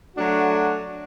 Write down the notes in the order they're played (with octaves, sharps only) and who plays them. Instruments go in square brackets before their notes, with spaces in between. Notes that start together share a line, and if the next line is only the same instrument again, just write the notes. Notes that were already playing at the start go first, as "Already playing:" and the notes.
[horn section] F#3 A3 D4 F#4